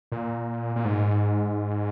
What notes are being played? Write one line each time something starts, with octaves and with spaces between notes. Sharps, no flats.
A#2
A#2
G#2